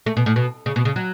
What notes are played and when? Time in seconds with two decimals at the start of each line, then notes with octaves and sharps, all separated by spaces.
0.06 A3
0.17 B2
0.26 A2
0.36 B2
0.66 C#3
0.76 B2
0.85 C#3
0.96 F#3